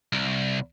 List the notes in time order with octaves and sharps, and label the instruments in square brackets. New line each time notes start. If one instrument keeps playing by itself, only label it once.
[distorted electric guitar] C2